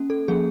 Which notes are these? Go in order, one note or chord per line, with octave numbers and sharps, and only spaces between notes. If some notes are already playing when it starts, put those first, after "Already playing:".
Already playing: A#3 C#4
A4
F3 A#3 C#4 G#4